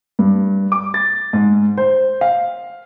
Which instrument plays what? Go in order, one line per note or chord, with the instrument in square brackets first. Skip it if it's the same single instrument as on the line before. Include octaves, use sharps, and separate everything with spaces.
[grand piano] G2
D6
A6
G#2
C5
F5